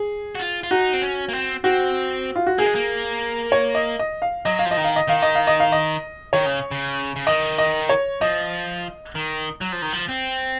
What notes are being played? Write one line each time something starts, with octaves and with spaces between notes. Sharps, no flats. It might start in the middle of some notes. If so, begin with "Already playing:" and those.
Already playing: G#4
F#4
F4
F4
D#4 F#4
C4
C#4
A#3
C4
C4 F#4
F4
F#4
A#3 G#4
G#3
A#3
C#5
D#5
D#5
F5
F#3 D#5
F5
F3
D#5
D#3
F5
D#5
D#3 F5
D#5
F5
D#5
F5
D#5
D#3 C#5
C#3
C#3
C#3
D#3 D#5
D#5
C#5
F3 D#5
D#3
F#3
F3
D#3
F3
C4